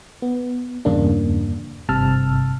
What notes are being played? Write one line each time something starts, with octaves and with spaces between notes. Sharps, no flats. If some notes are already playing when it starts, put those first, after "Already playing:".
B3
E2 G2 C#3 A#3 D4
G#1 G2 C3 A5 E6 F6